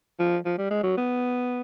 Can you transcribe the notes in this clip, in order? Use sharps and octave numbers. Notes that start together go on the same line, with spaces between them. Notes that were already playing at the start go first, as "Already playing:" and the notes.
F3
F3
G3
G#3
F#3
B3